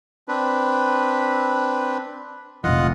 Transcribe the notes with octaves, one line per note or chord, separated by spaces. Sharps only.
C4 D4 B4
F1 A#1 F4 D#5 F#5